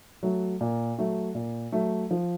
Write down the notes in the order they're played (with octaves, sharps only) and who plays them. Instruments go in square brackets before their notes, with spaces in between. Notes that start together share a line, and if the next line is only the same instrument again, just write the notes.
[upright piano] F#3 A3
A#2
F#3 A3
A#2
F#3 A3
F3